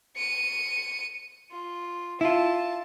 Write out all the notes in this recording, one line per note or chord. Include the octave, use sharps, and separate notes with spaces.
C#7 D#7
F4
E4 F4 A5